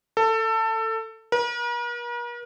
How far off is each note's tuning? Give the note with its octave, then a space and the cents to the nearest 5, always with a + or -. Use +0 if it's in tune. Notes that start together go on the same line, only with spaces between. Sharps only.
A4 +20
A#4 +45